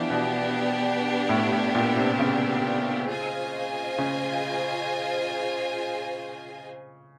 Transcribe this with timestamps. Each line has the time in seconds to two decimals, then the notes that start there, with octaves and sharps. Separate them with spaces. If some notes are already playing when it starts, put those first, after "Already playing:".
Already playing: E3 F3 B3 D4 G4
0.10 B2
1.29 A2
1.52 A2
1.75 A#2
1.96 C3
2.19 C#3
3.08 F4 G#4 C5 D#5 G#5
3.98 C#3